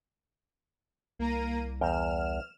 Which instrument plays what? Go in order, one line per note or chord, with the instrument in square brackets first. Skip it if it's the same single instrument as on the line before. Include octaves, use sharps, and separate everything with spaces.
[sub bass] C2 [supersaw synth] A#3 A#5 D#7
[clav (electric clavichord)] E2 G5 A#5 [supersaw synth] F6 E7